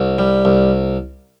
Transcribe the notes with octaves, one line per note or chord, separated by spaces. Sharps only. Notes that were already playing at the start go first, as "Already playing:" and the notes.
Already playing: C2
G3
C2